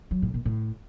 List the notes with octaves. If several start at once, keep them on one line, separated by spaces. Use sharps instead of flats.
F#3
A2
A#2
A2